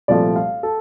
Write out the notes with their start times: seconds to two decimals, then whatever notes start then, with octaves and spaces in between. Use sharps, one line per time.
0.08 C2 A#2 F3 A3 D5
0.36 F5
0.63 A4